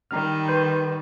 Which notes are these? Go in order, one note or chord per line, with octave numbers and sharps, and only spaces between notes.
D#3 G3 A#5 F6
B4 C6 G6